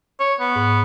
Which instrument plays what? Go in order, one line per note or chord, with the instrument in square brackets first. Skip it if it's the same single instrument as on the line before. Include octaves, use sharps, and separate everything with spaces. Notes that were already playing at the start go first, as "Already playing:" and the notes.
[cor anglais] C#5
B3
[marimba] G#2